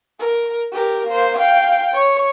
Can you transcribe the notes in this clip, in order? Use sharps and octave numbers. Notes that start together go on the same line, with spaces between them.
A#4
G4 A#4
A#3 C5
F5 G5
C#5